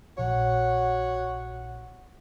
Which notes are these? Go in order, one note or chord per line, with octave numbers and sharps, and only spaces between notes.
A#1 F#4 C#5 F#5